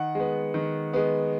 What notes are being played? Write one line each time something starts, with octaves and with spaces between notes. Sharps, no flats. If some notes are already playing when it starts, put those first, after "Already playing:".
Already playing: D#3 F#5
G#3 B3
D#3
G#3 B3